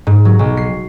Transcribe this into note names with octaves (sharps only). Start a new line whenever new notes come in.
G#2
F#3
B1
C7